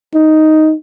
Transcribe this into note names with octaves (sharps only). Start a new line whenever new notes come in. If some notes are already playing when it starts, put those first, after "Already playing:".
D#4